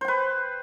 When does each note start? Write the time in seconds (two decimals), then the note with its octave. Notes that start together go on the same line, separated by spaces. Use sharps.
0.01 C5
0.05 G5
0.08 B4